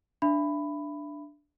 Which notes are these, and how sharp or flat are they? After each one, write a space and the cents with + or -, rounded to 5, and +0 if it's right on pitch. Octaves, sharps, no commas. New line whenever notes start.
D4 +0 E5 +25 B5 +10